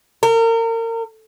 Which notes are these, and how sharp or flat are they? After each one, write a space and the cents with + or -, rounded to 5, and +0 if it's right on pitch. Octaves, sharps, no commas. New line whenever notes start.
A#4 -35